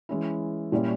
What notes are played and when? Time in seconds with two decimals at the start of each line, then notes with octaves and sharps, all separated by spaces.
0.09 E3 G#3 C#4 E4
0.72 A#2 G3 A#3 C#4 E4